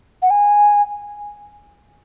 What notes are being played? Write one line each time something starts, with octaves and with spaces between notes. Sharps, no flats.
F#5
G#5